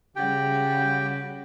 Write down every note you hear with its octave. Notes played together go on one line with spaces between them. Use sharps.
C#3 G3 F#4 G4 G5